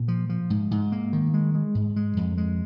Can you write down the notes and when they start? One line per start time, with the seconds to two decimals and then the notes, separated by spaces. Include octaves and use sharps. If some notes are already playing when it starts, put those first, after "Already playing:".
Already playing: A#2
0.08 F3
0.29 F3
0.50 G#2
0.71 G#2
0.92 A#3
1.13 D#3
1.34 G#3
1.55 G#3
1.75 G#2
1.96 G#3
2.17 F2
2.37 G#3